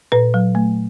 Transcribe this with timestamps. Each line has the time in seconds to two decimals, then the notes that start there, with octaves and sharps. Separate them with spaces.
0.12 A#2 B4
0.34 F#3
0.55 A3